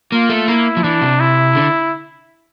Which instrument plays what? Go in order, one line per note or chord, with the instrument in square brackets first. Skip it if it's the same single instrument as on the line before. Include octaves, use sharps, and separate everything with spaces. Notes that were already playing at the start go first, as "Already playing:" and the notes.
[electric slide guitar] A#3 [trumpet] F4
[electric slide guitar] A3
[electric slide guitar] A#3 [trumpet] E4
[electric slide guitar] F3
[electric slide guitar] E3 [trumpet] D4
[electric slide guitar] C3
[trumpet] E4
[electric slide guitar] D3